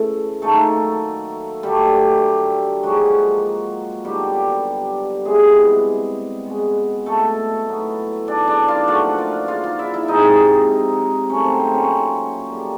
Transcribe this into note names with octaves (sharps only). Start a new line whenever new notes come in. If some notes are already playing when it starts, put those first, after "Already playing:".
Already playing: C#3 E3 A3 A4
D#3 F#3 A3 A#3 A4
D3 F#3 G3 A3 G4
A#2 F3 F#3 G#3 F#4
D3 F#3 G3 B3 G4
C3 E3 G3 G#3 B3 G#4
B2 G#3 B3
A3 A4
A2 F#3 B3
D4 D5
D4 D5
F4 F5
A#2 F3 A3 F#4 F#5
F4 F5
F4 F5
F4 F5
E4 E5
E4 E5
C3 F3 G#3 D#4 D#5
A#2 F#3 A3 C#4 C#5
C4 C5
C4 C5
C#4 C#5
D3 G3 A#3